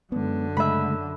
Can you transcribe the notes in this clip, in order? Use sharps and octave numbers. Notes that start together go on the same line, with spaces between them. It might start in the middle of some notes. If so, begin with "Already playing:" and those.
F#2 D3 G#3 B3
C#3 G#3 A3 E5 B5